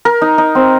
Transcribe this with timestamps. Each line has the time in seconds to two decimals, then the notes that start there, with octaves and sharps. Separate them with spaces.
0.05 A#4
0.22 D#4
0.38 D#4
0.55 C4